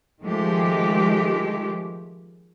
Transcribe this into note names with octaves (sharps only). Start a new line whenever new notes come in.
D#3 F3 G#3 A3 G4